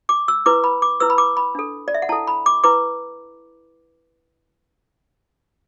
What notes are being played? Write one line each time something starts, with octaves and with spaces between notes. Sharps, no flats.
D6
E6
E4 B4 D6
B5
D6
E4 B4 E6
B5
D6
B5
D4 A4
D5
E5
F#5
E4 A4 A5
B5
D6
E4 B4 D6